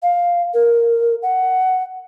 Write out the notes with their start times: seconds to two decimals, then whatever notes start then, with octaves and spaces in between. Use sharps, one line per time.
0.02 F5
0.54 A#4
1.22 F#5